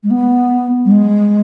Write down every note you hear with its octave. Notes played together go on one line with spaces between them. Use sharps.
G#3
B3
G3
G#3